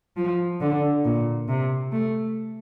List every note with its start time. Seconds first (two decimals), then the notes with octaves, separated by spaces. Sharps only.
0.16 F3
0.61 D3
1.05 A#2
1.48 C3
1.92 A3